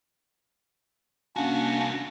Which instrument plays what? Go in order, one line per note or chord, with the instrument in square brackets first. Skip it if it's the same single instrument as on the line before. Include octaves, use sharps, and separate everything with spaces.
[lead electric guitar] C2 F#4 [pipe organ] A#3 C#4 D4